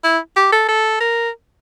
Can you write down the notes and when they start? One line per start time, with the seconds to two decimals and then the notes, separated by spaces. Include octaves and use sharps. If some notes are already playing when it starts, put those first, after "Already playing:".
0.04 E4
0.36 G4
0.53 A4
0.68 A4
1.00 A#4